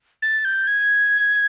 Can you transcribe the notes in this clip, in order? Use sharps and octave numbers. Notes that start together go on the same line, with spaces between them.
A6
G6
G#6